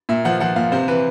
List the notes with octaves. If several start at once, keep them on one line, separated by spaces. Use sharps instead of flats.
A#2 E5
F3 F#5
F3 F#5
A#2 F5
C3 C5
E3 B4